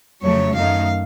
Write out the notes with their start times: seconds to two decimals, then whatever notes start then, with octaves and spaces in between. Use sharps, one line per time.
0.23 F2 C#3 F#3 A3 C#5
0.55 F#2 D#3 A3 D#4 F5